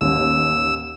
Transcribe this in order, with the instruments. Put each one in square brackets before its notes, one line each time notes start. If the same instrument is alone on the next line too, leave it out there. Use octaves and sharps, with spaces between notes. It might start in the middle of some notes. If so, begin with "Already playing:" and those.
[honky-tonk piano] A1 D#2 [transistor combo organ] E6